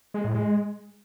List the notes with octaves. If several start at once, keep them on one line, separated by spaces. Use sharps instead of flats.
G#3
A2
G#3